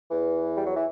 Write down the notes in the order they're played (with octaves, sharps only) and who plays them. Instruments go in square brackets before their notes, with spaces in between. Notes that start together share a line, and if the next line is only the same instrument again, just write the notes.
[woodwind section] E2 E3
G3
F#3
E3